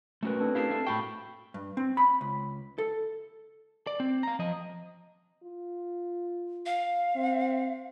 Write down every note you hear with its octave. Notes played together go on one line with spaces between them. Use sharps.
A3 C#4 F#4 A#4 B4
C4 D4 A4
E4 G4 A#4 F5 A5 C7
A3 C4 A4
A2 F#4 G5 B5 C#6
G2
C4
B5
C#2
A4
D5
C4
F5 A#5
F3 D#5
F4
F5
C4